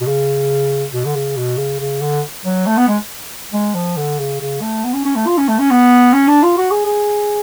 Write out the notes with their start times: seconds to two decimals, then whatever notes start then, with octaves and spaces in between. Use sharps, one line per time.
0.01 B2
0.07 C#3
0.94 B2
1.05 D3
1.15 C#3
1.37 B2
1.58 C#3
1.80 C#3
2.01 D3
2.45 F#3
2.66 A3
2.77 B3
2.88 G#3
3.53 G#3
3.75 F3
3.96 D3
4.19 C#3
4.41 C#3
4.62 A3
4.84 B3
4.94 C#4
5.05 C#4
5.16 A3
5.27 F4
5.38 C#4
5.48 A3
5.59 C#4
5.71 B3
6.13 C#4
6.28 D4
6.43 F4
6.58 F#4
6.71 G#4
6.86 G#4